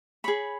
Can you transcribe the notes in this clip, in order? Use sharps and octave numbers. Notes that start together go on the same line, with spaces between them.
G#4 C#5 B5